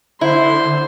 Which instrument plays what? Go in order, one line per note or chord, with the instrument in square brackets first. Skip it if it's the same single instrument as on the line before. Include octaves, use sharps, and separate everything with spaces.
[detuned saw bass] D3 [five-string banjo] E4 [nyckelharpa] C5 C6